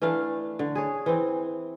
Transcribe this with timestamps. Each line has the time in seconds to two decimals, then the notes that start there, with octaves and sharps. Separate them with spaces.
0.02 E3 A3 D4 F5
0.59 D3
0.75 G#4 C#5
1.06 E3 C4